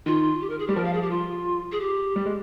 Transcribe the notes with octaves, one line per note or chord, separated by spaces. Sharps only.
D#3 F4
G4
A#4
G#4
G3 G4
F3 A#4
F5
G#4
G4
F4
G#4
G4
G3
G#3